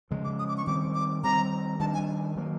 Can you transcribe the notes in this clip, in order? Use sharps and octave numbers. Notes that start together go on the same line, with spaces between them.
C#3 F3 G#3
D6
D#6
D6
C#6
D#3 G3 C4 D6
D6
D#3 G3 C4 A#5
D#3 G3 A#3 D4 A5
G#5
D#3 F#3 A#3